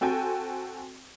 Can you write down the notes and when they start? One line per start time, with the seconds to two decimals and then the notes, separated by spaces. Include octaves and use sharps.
0.01 C4 F#4 A4 G5 G#5